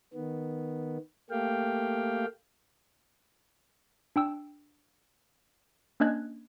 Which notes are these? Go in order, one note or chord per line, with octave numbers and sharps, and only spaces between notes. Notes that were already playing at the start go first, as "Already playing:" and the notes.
D#3 B3
A3 A#3 G4 F5 G5
D4 G5 E6
A#3 C#4 D4 D#5 F#6 G#6